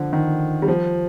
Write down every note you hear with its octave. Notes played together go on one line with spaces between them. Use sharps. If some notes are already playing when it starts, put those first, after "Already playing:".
Already playing: D3 F3
D#3
G3
F3